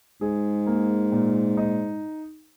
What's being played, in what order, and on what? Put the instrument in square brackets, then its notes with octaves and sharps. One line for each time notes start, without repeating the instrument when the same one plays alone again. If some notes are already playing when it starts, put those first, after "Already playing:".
[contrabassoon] G#2 [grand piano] G#4
[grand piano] A#3
A#2
D#4